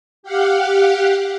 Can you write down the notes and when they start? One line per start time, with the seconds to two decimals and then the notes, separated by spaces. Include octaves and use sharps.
0.23 G4 F5 F#5